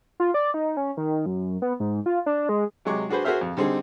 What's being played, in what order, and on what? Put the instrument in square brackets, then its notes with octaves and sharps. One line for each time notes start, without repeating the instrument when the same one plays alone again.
[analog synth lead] F4
D5
D#4
C#4
D#3
F#2
B3
G#2
F4
D4
G#3
[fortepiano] C3 F#3 G#3 C#6 D6
D4 F#4 G#4 B4 C5
F#4 G#4 A#4 C5 E5 F6
F2
D3 G3 C4 D#4 G#4